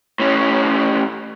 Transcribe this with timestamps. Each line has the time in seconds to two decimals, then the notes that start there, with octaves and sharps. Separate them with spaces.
0.20 A2 C#4